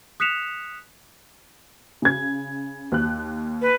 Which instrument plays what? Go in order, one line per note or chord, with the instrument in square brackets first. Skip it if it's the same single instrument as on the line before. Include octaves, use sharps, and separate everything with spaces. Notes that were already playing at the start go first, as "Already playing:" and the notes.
[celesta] D#6 F#6 B6 C#7 E7 F7
[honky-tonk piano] C#3 G#6
D#2 F#6
[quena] B4